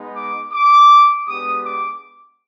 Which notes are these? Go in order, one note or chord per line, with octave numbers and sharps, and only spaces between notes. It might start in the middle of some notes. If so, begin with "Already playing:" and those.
Already playing: G#3 B3 D#4
D6
D6
G#3 B3 D4 G4 D#6
D6